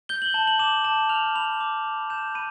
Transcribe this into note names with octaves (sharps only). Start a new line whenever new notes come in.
G6 G7
F#7
A5
F#7
D6 E7
A5 E7
F6 F7
B5 F7
D6
B5
G6 E7
B5 D#7